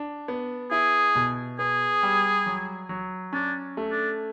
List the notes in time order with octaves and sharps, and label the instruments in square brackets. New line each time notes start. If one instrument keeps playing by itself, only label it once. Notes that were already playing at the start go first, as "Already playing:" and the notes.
Already playing: [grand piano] D4
B3
[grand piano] E4 [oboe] G#4
[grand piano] B2
[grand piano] B3 [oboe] G#4
[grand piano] G3
F#3
F#3
[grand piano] C#4 [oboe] D4
[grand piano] A3
[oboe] D4